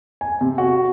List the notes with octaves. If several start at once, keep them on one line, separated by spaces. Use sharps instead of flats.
G#5
C3
F#4